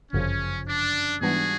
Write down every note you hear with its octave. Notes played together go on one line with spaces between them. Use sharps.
G1 F#2 C#3 F3 C#4
D4
G#2 E3 G3 B3 D4 F#4 G#4